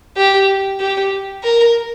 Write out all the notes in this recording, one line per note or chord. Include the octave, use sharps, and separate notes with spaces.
G4
G4
A#4